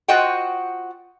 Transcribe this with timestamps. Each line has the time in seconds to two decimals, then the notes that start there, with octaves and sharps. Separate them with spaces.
0.08 F4 F#4 C5 D#5 F#5 G5